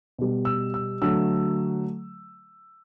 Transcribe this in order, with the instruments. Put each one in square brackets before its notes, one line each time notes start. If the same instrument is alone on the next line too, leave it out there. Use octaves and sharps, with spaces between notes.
[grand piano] B2 G3
E6
E6
D3 F#3 A3 E6